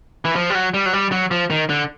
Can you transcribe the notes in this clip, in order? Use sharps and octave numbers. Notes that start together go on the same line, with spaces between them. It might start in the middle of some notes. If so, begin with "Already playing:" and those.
E3
F3
G3
F#3
G3
F#3
G3
F#3
F3
D#3
D3